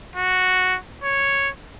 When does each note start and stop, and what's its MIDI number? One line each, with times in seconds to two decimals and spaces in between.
0.16 0.77 66
1.04 1.49 73